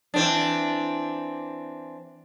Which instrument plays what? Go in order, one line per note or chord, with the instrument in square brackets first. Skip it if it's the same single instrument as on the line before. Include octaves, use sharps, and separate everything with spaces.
[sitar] E3 C4 D4